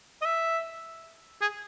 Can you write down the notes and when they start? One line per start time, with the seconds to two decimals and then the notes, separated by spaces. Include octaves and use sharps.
0.22 D#5
0.25 E5
1.41 G#4